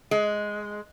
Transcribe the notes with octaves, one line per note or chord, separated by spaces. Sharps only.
G#3